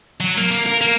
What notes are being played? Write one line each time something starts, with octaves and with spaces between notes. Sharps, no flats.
F#3
A#3
A#3
A#4
A#3